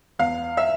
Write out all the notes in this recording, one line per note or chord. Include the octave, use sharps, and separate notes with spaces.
E2 F5
E5